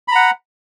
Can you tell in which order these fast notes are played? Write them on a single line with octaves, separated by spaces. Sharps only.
B5 A#5 F#5